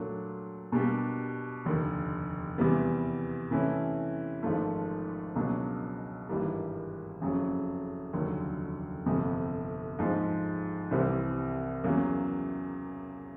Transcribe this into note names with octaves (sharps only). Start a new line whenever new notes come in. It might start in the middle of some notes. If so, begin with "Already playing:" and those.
Already playing: A#2 F#3 A3 D4
B2 G3 A#3 D4 G4
F1 D#2 D3
E2 C3 E3 G3 B3
C3 E3 A3 C#4 E4
G#1 G#2 F3 A3
C#2 B2 F#3 A#3 D4
G#1 G2 E3 G3 A#3
F#1 F2 C#3 F#3
F1 D#2 D3 F#3
G1 F2 C3
G#2 F3 G#3
C2 C3 E3 G3 C4
E2 C#3 F#3 A#3